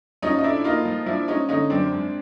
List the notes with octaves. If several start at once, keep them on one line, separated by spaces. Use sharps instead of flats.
F3 C#4 D#4
D#4
A2 D4 E4
A#3 D#4 F4
F3
F3 D4 E4
G#3 C#4 D#4
D3 C#4 D#4
F#2 C4 D4
G#2